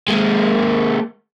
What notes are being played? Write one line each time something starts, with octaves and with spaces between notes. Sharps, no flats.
G#3 A#3